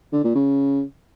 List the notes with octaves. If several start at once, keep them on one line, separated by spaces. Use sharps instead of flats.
D3
A#2
C#3